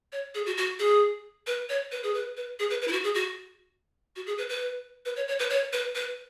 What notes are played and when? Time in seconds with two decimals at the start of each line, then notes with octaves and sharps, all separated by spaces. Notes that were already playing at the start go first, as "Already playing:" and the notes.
0.12 C#5
0.35 G#4
0.46 F#4
0.57 F#4
0.79 G#4
1.47 B4
1.69 C#5
1.92 B4
2.03 G#4
2.14 B4
2.37 B4
2.59 G#4
2.70 B4
2.82 B4
2.88 E4
2.92 F#4
3.04 G#4
3.15 F#4
4.16 F#4
4.27 G#4
4.38 B4
4.49 B4
5.05 B4
5.16 C#5
5.28 C#5
5.39 B4
5.50 C#5
5.73 B4
5.95 B4